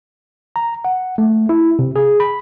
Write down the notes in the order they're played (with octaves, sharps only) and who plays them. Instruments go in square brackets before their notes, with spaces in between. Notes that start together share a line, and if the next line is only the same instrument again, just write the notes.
[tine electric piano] A#5
F#5
A3
E4
C3
G#4
B5